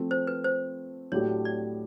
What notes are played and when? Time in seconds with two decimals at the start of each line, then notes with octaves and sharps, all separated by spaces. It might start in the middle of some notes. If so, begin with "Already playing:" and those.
Already playing: F3 A3 C4
0.11 C5
0.27 B4
0.44 C5
1.12 A2 F#3 A3 D4 G4 C#5
1.45 D5